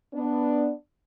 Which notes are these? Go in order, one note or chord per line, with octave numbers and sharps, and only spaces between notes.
B3 D4